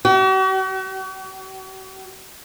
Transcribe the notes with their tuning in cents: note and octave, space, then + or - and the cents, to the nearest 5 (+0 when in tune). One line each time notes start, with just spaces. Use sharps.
F#4 +45